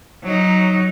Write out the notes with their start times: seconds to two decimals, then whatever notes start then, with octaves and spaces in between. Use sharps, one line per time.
0.23 F#3 D#4